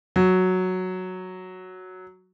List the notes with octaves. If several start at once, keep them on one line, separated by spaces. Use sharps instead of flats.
F#3